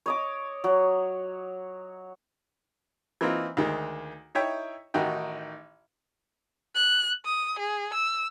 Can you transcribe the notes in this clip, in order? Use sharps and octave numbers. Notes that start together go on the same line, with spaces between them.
C#5 D#5 D6
F#3
E3 A#3 C4 D#4 F4
D2 D#3 G#3
D#4 E4 C#5 E5 G5
A1 D#3 D#4 F#4 G5
F#6
D#6
G#4
E6